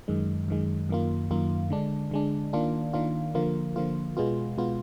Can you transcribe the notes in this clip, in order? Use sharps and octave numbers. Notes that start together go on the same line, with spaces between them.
F#2 D#3 G#3
F#2 D#3 G#3
F#2 D#3 A#3 F4
F#2 D#3 A#3 F4
D3 G#3 D4
D3 G#3 D4
D#3 A#3 D4 F4
D#3 A#3 D4 F4
D3 F3 A#3 F4
D3 F3 A#3 F4
B2 G#3 B3 F4
B2 G#3 B3 F4